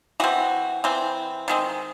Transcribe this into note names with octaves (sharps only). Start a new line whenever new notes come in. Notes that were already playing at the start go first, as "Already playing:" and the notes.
E3 C4 F#4
E3 C4
D#3 G#3 C4